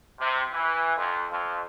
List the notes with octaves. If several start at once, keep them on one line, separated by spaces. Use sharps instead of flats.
C3
E3
F2
F2